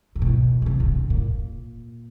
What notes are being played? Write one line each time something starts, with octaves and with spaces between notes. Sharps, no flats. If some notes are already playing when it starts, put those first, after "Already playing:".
C3
B2
C#3
C3
C#3
D3
A#2